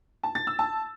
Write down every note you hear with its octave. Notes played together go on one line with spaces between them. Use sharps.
A5
A6
E6
A5